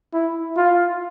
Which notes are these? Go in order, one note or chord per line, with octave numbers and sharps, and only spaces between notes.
E4
F4